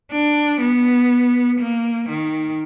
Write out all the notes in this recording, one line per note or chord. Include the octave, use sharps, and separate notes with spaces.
D4
B3
A#3
D#3